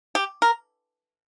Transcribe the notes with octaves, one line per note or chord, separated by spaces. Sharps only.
G4
A#4